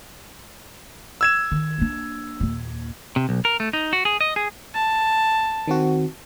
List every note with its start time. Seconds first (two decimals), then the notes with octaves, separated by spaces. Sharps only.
1.21 E6 G#6 E7
1.51 D#3
1.78 A#3 D4
2.40 D#2 A#2
3.16 C3
3.29 B1
3.45 A#4
3.60 A3
3.73 D#4
3.93 F#4
4.05 G#4
4.21 D#5
4.36 G#4
4.74 A5
5.67 D#3 C4 F#4